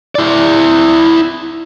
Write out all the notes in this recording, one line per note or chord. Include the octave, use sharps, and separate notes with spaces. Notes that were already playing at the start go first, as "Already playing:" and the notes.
E4 D5